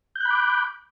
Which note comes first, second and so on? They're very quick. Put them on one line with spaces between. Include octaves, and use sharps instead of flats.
G6 F#6 B5 D6